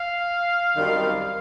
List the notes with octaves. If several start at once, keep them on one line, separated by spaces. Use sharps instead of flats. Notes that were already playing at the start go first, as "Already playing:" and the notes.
Already playing: F5
F#2 D#3 G3 C4